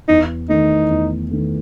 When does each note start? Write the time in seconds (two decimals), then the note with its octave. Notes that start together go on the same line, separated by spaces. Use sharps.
0.09 E2 D#4
0.49 D#3 A3 D#4
0.90 E2
1.31 D#3 A3